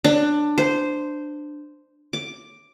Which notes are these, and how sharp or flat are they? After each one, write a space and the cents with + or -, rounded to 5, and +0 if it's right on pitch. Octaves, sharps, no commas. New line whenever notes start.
D4 +15
C5 -10
D6 +5